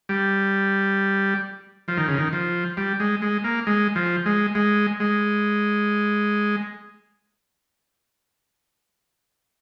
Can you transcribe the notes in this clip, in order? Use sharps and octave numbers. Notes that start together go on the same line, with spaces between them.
G3
F3
D#3
C#3
D#3
F3
G3
G#3
G#3
A#3
G#3
F3
G#3
G#3
G#3